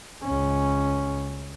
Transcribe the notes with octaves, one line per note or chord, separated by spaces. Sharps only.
C#2 C#4